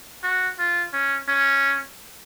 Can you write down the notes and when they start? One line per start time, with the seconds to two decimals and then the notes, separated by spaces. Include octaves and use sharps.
0.23 F#4
0.59 F4
0.93 C#4
1.28 C#4